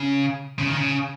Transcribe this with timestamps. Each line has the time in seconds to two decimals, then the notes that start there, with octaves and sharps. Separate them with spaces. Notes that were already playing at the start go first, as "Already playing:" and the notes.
Already playing: C#3
0.59 C#3
0.67 D#3
0.77 C#3